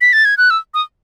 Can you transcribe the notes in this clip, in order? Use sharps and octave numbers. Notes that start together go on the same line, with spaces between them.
B6
A6
G#6
F#6
E6
D#6